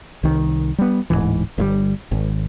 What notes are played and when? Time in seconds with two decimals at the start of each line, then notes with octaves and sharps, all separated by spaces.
0.23 C2 D#3
0.78 G3 B3
1.10 D1 C#2 G#2 E3
1.58 G1 C#3 G3
2.12 G#1